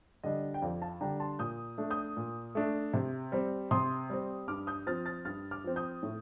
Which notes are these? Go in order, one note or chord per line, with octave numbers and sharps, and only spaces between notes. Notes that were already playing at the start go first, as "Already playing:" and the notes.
D3 G3 D4 D#5
G5
F2 D5 F5
F5 A5
D3 G3 D4 G5 A#5
A5 C6
A#2 D#6 G6
A3 D4
D#6 G6
A#2
A3 D4
C3
G3 C4
C3 C6 D#6
G3 C4
G2 D6 F6
D#6 G6
F3 C4 F6 A6
F6 A6
G2 F6 A6
D6 F6
F3 C4
D#6 G6
A2